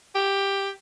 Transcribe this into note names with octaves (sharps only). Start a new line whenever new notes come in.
G4